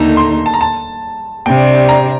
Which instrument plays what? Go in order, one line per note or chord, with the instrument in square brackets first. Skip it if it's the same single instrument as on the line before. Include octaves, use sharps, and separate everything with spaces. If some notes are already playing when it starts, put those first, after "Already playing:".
Already playing: [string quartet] D#2 D3 A3 D#4 [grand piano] A#5
[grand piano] C6
A5
A#5
A5
[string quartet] C3 G3 D4 [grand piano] G5
[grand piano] A#5